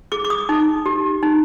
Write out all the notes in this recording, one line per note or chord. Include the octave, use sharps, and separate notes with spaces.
G#4 D6
D6
D#6
D#4
G4
D#4